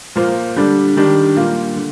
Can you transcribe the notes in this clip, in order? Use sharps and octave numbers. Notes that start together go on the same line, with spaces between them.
A#2 F3 A#3 F4 C5
D3 G3 D4
D#3 G3 D4 G4
A#2 G3 A#3 F4
D3